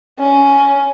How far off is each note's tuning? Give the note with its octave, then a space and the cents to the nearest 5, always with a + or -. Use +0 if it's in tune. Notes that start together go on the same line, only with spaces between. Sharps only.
C#4 +10